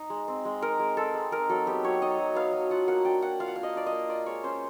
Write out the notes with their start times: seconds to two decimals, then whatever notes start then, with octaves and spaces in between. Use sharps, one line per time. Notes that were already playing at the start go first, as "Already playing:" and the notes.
Already playing: D#4
0.10 G#3
0.28 C4
0.45 G#3
0.62 D#4 A#4
0.79 G#3
0.97 C4 A4
1.14 G#3
1.32 D#4 A#4
1.49 F#3 A4
1.67 B3 G4
1.84 F#3 C#5
2.02 D#4 D#5
2.19 F#3
2.35 B3 F5
2.53 F#3
2.71 F4 F#5
2.88 A#3 F#5
3.05 D4 G5
3.22 A#3 F#5
3.39 F4 F5
3.48 F#5
3.55 A#3 F5
3.63 D#5
3.74 D4 D5
3.86 D#5
3.92 A#3
4.09 F4 D5
4.26 G#3 C#5
4.44 C#4 C5